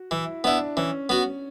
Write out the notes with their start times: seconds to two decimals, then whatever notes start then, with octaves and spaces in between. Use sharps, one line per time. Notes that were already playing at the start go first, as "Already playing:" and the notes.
Already playing: F#4
0.11 E3 E4
0.44 B3 D4 E4
0.77 E3 C#4
1.09 B3 F#4